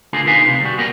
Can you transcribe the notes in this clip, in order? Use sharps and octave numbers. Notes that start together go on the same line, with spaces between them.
D3 A3 A#3 D4 F4 G#4
B2 D#4 B4 F5 G#5
D2 C3
G3 F#4
G3 A#3 B3 A#4 B4 F#5